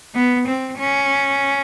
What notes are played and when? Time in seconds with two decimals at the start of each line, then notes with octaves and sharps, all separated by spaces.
0.15 B3
0.47 C4
0.79 C#4